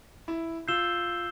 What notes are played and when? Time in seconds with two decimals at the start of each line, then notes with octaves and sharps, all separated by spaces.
0.28 E4
0.68 F4 E6 G6 C7 E7 G7